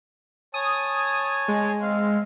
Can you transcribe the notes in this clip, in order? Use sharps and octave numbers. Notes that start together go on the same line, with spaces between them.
C#5 G#5 A5 D#6
G#3
C4 F5